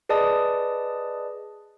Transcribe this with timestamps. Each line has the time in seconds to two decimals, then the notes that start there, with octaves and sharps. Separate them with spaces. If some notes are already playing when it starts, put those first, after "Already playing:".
0.09 G#4 B4 D5 D#5 A5 D#6